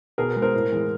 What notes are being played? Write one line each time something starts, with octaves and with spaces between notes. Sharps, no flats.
B2 G#4 A#4
G#3
A#4 C5
A2
E3 G#3